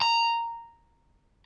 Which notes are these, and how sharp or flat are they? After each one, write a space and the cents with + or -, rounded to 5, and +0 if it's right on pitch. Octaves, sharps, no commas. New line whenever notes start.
A#5 -5